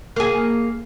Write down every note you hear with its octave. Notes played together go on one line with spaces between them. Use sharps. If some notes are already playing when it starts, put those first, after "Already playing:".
A#3 G#4